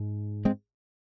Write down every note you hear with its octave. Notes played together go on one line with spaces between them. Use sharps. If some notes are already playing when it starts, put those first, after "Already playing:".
Already playing: G#2
G#3 C4